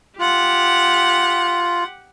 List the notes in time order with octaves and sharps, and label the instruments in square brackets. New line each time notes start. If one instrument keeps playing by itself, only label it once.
[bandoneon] F4 [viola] G4 F#5